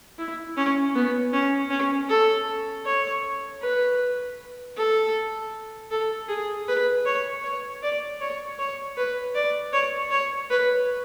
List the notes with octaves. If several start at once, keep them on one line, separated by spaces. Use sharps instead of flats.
E4
C#4
B3
C#4
C#4
A4
C#5
B4
A4
A4
G#4
B4
C#5
C#5
D5
C#5
C#5
B4
D5
C#5
C#5
B4